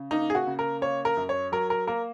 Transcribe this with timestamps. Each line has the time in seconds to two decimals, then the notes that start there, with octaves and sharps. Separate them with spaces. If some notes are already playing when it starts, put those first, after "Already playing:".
Already playing: C#3
0.11 A#3 D#4
0.30 G#4
0.35 F#4
0.47 C#3
0.59 A#4
0.81 A#3 C#5
1.05 A#4
1.17 F#2
1.29 C#5
1.52 F#3 A#4
1.70 A#4
1.87 A#3 A#4